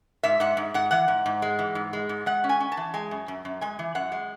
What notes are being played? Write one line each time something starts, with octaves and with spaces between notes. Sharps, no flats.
G#2 E5
G#2 F#5
G#2
G#2 F#5
E3 F#5
G#2
G#2
G#3
E3
G#2
G#3
G#2
G#3 F#5
C#4
G#5
C#4
A5
E3
G#3 G#5
F#2
F#2
F#2
G#3 G#5
E3
F#2 F#5
G#3